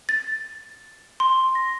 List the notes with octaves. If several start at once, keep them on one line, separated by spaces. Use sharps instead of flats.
A6
C6
A#6